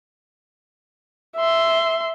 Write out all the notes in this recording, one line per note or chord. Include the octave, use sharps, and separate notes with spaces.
E5 C6